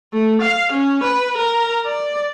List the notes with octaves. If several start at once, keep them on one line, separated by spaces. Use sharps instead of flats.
A3
F5
C#4
B4
A#4
D5